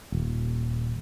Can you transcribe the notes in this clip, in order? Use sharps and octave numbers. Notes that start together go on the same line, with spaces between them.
D#1